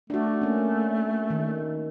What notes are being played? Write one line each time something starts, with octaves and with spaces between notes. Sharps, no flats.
A3 D4 F#4
A#3 C#4
D#3